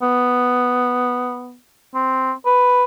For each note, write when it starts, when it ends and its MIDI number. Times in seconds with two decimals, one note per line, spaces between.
0.02 1.56 59
1.95 2.32 60
2.46 2.84 71